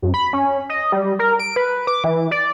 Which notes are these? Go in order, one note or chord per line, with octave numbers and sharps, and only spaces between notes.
F#2
B5
C#4
D#5
G3
A#4
D7
B4
D6
E3
D5